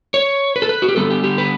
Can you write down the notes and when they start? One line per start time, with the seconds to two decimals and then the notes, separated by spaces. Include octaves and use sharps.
0.14 C#5
0.56 B4
0.62 A4
0.69 B4
0.82 F#4
0.89 G4
0.96 D3 G3 B3 A4
1.10 G4
1.24 G4
1.38 B4